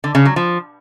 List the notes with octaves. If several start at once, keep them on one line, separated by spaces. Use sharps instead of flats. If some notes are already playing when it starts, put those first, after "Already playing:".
D3
C#3
F#3
F3